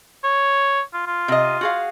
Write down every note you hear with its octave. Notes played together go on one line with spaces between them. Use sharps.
C#5
F4
F4
C3 D#5
F#4 G#4 F5